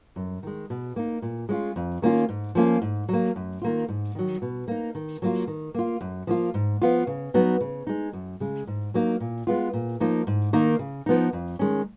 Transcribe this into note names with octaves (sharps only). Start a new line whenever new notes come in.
F#2
D#3 G#3
B2
A#3 D#4
A#2
G#3 C#4 F4
F2
D#3 A#3 C#4 F4
G#2
F3 A#3 C#4 F4
G#2
F#3 A#3
F#2
D#3 A#3 F4
G#2
D#3 F#3
B2
A#3 D#4
D#3
F#3 A#3 F4
D#3
A#3 F4
F#2
F3 A#3 F4
G#2
F3 B3 F4
C#3
F#3 B3 D#4
C#3
G#3 D#4
F#2
C#3 G#3
G#2
F#3 A#3 D#4
A#2
G#3 B3 F4
A#2
F3 A#3 D#4
G#2
D#3 A#3 D#4
C#3
F3 B3 D#4
F2
D#3 G#3 C#4